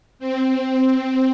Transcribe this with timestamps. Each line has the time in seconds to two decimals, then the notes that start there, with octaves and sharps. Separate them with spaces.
0.19 C4